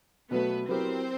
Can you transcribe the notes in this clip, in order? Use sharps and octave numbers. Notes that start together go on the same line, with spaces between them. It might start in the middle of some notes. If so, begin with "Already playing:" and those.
B2 F#3 A3 B3 B4
F#3 B3 C4 E4 G4 A#4 C5